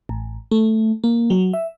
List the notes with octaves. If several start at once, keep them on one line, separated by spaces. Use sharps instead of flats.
A1
A3
A#3
F#3
E5